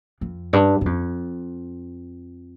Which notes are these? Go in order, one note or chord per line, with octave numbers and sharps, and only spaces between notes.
F2
G2
G2
F2